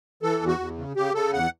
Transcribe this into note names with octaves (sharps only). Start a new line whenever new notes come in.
E3 A4
E2
F#4
E2
C#3
C#3 G4
C#3 A4
E2 F#5